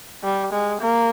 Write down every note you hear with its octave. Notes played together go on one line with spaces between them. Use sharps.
G3
G#3
A#3